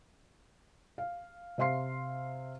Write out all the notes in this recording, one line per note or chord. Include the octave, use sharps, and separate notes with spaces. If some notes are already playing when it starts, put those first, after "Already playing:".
F5
C3 E5 F5 C6 C7